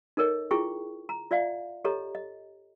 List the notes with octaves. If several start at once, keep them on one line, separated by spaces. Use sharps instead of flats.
D#4 A4 A#4 C#5 D#5
E4 F4 G#4 G5 C#6
A#5
F4 D5 E5 F5
G4 A4 C#5 D#5 A#5
D#5